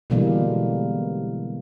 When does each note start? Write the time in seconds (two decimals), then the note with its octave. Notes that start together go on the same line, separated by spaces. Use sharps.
0.10 B2 D3 E3 G3 G#3 A#3